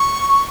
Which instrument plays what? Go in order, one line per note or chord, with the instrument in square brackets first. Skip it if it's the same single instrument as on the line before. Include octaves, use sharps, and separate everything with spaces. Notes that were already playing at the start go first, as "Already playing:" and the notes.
Already playing: [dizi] C#6